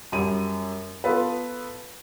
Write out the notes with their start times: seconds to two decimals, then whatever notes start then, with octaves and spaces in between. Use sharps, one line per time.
0.12 F#2 G3 D#7
1.04 B3 F4 A4 B4